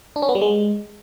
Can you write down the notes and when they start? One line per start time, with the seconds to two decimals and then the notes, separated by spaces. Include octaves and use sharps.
0.16 D4
0.22 C#4
0.29 B3
0.35 G3
0.42 G#3